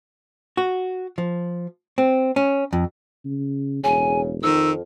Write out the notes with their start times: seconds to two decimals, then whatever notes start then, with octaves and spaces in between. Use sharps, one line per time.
0.57 F#4
1.18 F3
1.98 C4
2.36 C#4
2.73 F2
3.25 C#3
3.84 E1 C#3 G#5
4.43 F2 D#3 E6